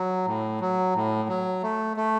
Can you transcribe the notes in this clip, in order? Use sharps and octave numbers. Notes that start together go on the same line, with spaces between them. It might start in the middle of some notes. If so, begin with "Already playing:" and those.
Already playing: F#3
A2
F#3
A2
F#3
A3
A3